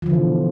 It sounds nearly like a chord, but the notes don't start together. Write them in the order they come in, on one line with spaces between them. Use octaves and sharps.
F3 D3 E3 B2